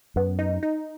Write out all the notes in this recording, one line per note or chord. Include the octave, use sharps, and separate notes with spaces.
F#2 B3
D#4
D#4